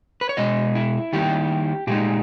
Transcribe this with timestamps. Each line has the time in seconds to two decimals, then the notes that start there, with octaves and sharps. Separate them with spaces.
0.21 B4
0.29 C#5
0.37 B2 G#3 D#5
0.75 E4
1.13 D#3 G3 A#3 E4 G4
1.87 A#2 G#3 D#4 G4